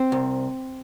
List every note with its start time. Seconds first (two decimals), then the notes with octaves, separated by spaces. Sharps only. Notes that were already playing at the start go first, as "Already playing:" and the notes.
Already playing: C4
0.12 C2